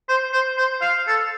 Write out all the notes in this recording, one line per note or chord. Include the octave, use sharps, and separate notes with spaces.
C5
C5
C5
F5
A4